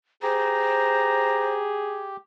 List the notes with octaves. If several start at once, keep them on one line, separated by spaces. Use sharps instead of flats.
G4 G#4 C5 A#5